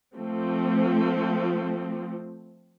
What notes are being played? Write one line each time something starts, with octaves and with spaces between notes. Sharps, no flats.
F3 A3 C4